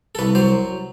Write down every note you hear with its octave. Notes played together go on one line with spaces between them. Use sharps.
A4
C2 B4
F#3 C5